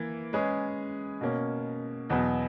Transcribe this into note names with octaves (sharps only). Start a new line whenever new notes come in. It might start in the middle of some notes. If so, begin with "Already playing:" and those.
Already playing: E3 A#3
G#3 C#4 G#4 B4
B2 A#3 C#4
E2 B2 F#3 B3